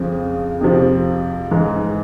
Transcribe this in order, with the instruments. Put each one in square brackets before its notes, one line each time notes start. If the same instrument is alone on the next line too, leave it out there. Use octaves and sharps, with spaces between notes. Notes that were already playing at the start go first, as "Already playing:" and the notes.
Already playing: [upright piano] F2 C#3 F3
F2 C3 F3
G#2 E3